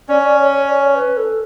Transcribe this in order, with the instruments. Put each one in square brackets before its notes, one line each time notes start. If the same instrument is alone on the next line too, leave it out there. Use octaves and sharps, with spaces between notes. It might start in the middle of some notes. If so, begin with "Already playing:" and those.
[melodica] C#4 [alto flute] D5
[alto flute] D5
C#5
C#5
D5
C#5
B4
A4